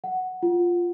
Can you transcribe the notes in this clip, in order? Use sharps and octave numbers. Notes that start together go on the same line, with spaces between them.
F#5
F4